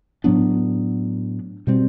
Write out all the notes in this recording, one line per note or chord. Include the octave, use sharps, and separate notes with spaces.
A2 F#3 B3 D4
B2 G3 C4